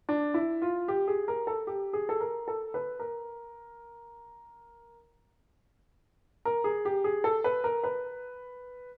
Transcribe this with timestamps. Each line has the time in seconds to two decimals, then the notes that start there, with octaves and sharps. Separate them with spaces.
0.09 D4
0.34 E4
0.62 F4
0.88 G4
1.07 G#4
1.28 A#4
1.47 A4
1.67 G4
1.93 G#4
2.09 A4
2.20 A#4
2.48 A4
2.74 B4
3.00 A#4
6.45 A#4
6.64 G#4
6.85 G4
7.04 G#4
7.24 A4
7.44 B4
7.64 A#4
7.84 B4